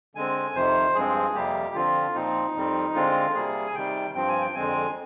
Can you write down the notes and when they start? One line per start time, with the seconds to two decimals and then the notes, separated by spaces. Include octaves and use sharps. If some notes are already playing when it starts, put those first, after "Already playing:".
0.15 D3 G#3 C4 G#5
0.54 F2 C3 D#3 C5
0.95 G2 F3 G#3 C4 G#4
1.34 F2 C3 G3 A#3 G4
1.75 D3 F3 C4 F4
2.15 A#2 F3 C4 D#4
2.55 F2 D#3 G3 C4
2.95 D3 G#3 C4 F4
3.34 C3 G3 A#3 G#4
3.67 G#5
3.75 C3 D#3 G3 G5
4.15 G2 F3 C4 G5
4.29 G#5
4.41 G5
4.55 F2 D3 G#3 C4 G#5